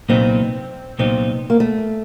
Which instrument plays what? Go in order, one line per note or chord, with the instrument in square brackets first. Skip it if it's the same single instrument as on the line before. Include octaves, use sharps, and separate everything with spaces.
[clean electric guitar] C2 A#2 F#3 B3 D#4 [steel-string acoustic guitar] C4
[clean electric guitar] C2 A#2 F#3 B3 D#4 [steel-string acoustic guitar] C4
[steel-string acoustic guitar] A#3
A3